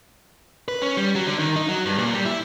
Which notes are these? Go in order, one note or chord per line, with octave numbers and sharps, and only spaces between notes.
B4
C#4
G3
F#3
D3
D#3
D#4
F#3
G2
A#2
G3
E4